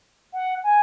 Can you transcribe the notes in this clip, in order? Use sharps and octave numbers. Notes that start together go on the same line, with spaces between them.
F#5
G#5